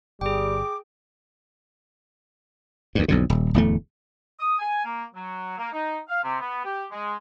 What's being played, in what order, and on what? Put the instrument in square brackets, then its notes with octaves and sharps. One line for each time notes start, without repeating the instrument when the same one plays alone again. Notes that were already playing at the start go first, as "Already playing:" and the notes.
[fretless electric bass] G1 [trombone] G3 [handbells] G#4 G5 [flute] D6
[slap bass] D2 G2
B1 F2 D3
D#1
D1 E2 A3
[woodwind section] D#6
G#5
A#3
F#3
A#3
D#4
F5
C3
B3
G4
G#3